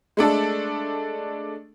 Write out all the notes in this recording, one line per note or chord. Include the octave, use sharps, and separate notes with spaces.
G#3 A3 D4 A4